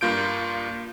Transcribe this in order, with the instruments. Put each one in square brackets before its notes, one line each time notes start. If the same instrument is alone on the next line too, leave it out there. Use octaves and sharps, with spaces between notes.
[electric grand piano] G2 A#3 F4 G6 D7